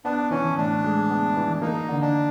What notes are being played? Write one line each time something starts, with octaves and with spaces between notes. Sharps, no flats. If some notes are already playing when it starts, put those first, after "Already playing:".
B3 D4
E3 C#4
A2 D4
G#3
B3
E3
A#3 D#4
D3
D4